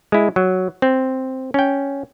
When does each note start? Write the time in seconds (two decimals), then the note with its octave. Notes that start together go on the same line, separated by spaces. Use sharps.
0.12 G#3 E4
0.36 F#3
0.82 C4
1.54 C#4 G5